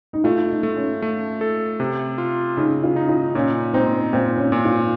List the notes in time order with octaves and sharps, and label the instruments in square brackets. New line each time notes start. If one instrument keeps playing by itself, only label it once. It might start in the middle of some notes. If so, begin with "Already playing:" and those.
[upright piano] D#4
[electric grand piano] A3 [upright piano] F4
[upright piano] D#4
[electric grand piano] A3
[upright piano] C#4
[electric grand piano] A3
A4
C3
F4
[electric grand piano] C#3 [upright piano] D#4
[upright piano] F4
[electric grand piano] D#4
[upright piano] F4
[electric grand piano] A#2 [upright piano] C#4
[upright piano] C4 [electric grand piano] D#4
[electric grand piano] A#2 [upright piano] C4
[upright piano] C#4
[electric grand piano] A#2
[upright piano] F4